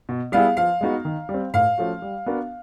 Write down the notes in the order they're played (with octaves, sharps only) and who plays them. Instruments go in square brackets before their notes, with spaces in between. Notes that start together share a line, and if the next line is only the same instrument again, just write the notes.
[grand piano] B2
[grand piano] G3 B3 E4 G#4 [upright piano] F5
[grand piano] F3 [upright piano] F5
[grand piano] G#3 B3 D#4 F#4
D#3
G3
C4
[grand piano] A2 [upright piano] F5
[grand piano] F3 A3 C#4 F#4
G3
B3 D4 F#4 A#4